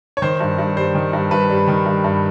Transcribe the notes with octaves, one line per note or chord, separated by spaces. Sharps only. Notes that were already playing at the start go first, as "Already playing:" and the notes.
C#5
D#3 C5
G2
G2
G3 C5
D#3
G2
G2 B4
G3
D#3
G2
G2